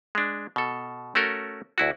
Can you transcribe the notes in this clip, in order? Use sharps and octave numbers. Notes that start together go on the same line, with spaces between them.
G#3 D4
B2 A4
A3 C#4 F#4 A4 A#4
D2 E4 F#4